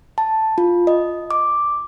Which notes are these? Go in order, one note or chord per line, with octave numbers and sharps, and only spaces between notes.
A5
F4
D#5
D6